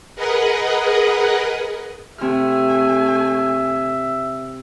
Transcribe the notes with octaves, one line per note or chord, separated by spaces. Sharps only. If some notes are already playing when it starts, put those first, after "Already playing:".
G#4 A#4 B4 D#5 F#5
C3 A3 E5 G#5 F6